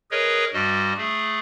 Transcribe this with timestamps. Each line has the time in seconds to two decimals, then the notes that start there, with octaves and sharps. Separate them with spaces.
0.11 G#4 A#4 B4 C#5 D#5
0.53 G2 G3 F#4 D#5
0.98 A3 G#4